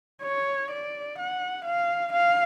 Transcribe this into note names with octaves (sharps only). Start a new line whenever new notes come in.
C#5
D5
F#5
F5
F5